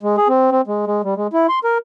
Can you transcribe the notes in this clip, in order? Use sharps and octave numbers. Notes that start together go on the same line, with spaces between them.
G#3
G#4
C4
C4
G#3
G#3
G3
G#3
E4
C6
A#4